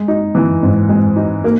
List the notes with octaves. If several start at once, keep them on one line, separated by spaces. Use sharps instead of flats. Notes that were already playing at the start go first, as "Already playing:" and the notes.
Already playing: G#3
D#4
E3
G#2
G#3
D#4
A#3